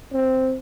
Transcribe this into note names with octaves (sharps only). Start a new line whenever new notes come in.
C4